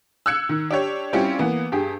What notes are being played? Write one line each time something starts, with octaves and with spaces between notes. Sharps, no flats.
E6 F#6 G#6 C#7
D#3
D4 G4 C#5
G3 C4 C#4 E4 F4 G4
E3 A#3 B3
G2 G4 G#4